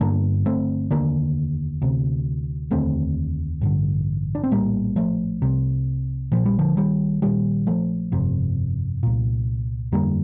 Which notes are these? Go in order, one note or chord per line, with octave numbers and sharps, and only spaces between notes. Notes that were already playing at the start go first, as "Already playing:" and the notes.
G1 G2 D3 A#3 D4
A3 C4
F1 D#2 D3 A#3 D4
D2 C3
F1 D#2 D3 A3 C4
A1 G2 D3
D4
C4
A#1 A2 G3 A#3
F3 A3
C2 C3
A#1 A#2 F3
G3
D3 F3
D#3 G3
A#1 A#2 D#3 G3
F3 A3
G1 F2 C3
C2 A#2
G1 F2 D3 G3 A#3